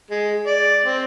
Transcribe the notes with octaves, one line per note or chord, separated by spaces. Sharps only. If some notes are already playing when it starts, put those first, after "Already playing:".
G#3
D5
C4